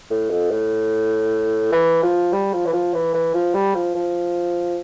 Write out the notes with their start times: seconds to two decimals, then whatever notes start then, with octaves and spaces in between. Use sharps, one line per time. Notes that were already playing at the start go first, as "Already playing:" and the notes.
0.10 A2
0.30 F2
0.51 A2
1.72 E3
2.03 F3
2.33 G3
2.53 F3
2.66 E3
2.73 F3
2.94 E3
3.14 E3
3.34 F3
3.54 G3
3.75 F3
3.95 F3